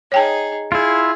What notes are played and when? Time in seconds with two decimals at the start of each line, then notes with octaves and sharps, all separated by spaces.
0.12 D#4 G#4 C#5 G5 A5
0.72 E4 F4 G#4